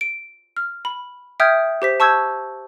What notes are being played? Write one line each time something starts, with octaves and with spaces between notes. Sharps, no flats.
D7
F6
B5
E5 G5 D#6 F6 G6 G#6
G4 C5 B6
A5 C#6 E6 G6 G#6